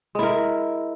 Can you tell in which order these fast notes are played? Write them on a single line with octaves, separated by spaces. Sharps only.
G#3 E4 A#4